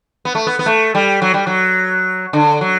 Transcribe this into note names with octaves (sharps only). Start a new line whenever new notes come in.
B3
A3
B3
B3
A3
G3
F#3
G3
F#3
D3
F#3